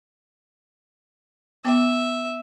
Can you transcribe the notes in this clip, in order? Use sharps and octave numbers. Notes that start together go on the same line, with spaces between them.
B3 E5 G5 D6